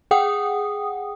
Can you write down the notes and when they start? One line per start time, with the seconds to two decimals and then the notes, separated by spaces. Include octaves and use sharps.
0.11 G#4 F#5 G5 D#6